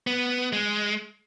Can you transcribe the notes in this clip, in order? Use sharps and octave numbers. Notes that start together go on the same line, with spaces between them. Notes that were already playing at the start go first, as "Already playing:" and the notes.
B3
G#3